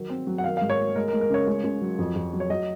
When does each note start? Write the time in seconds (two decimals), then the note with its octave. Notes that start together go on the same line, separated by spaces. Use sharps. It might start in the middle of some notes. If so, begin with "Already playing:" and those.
Already playing: D#3 F#3
0.10 C4
0.27 F#3
0.38 F#5
0.44 D#3 F5
0.57 G#2 F5
0.70 C#5
0.78 A#3
0.96 G#3 A#4
1.08 A#4
1.13 G#3
1.21 A#4
1.30 C#3 C#5
1.48 C#2
1.64 C#2
1.82 F#3
1.99 F2
2.16 F2
2.33 F#3
2.40 C#5
2.50 F#3 D#5